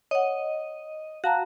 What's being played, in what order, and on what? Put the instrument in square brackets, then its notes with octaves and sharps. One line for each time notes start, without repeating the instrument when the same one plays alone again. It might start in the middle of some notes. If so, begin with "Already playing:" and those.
[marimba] C#5 F#5 [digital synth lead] D#5
[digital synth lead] F#4 [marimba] F5 A5 A#5